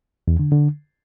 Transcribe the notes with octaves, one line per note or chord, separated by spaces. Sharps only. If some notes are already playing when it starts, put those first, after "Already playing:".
E2
D3
D3